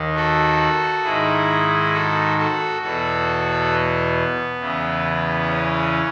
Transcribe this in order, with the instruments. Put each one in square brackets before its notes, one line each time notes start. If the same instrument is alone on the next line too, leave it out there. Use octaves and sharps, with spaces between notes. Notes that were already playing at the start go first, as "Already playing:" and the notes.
Already playing: [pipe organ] D#2 D#3
F#4 A4
G#2 D#3 E4 G#4
F#4 A4
F#4 A4
E2 B2 F#4 A4
B3
E2 C#3 E3
C#4